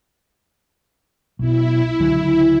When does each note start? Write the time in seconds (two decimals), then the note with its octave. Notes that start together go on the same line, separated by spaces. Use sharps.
1.39 B1 B2 E4
1.99 C#2 D3 F#3